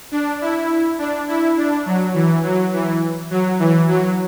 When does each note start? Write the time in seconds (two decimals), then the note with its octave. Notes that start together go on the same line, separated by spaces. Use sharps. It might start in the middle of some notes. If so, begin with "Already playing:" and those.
0.12 D4
0.41 E4
0.99 D4
1.28 E4
1.57 D4
1.86 F#3
2.14 E3
2.43 F#3
2.73 E3
3.30 F#3
3.60 E3
3.88 F#3